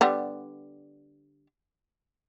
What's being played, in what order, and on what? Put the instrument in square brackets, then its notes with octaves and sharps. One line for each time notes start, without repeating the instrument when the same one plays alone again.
[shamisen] D3 G3 B3